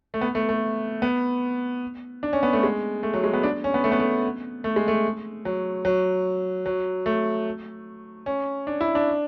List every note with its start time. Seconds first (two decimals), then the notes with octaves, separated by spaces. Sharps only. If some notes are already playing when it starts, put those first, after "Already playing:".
0.14 A3
0.21 B3
0.35 A3
0.49 A3
1.02 B3
2.23 D4
2.33 C#4
2.43 B3
2.53 A3
2.63 G#3
3.03 A3
3.14 F#3
3.24 G#3
3.33 B3
3.43 D4
3.64 C#4
3.74 B3
3.84 A3
3.92 B3
4.00 A3
4.64 A3
4.76 G#3
4.88 A3
5.45 F#3
5.85 F#3
6.66 F#3
7.06 A3
8.26 C#4
8.67 D4
8.81 E4
8.95 D4